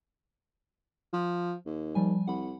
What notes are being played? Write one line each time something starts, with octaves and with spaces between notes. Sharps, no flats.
F3
D#2
F3 G3 G#5
C2 F#5 B5